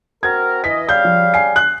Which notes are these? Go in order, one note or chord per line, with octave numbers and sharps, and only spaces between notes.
C4 F#4 A#4 G#6
E3 D#5 B6
C#3 G3 F5 G6
F3
G#5 C7
F#6